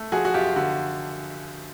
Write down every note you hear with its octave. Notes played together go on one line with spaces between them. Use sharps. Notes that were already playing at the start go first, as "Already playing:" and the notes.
Already playing: A3
F3 F#4 G#4
F#4
F#2 F4 G4
D3 F#4